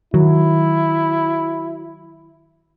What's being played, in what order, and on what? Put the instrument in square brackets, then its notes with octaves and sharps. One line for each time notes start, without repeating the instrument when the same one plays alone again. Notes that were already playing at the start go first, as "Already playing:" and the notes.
[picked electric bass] D#3 [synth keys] F#3 [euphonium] E4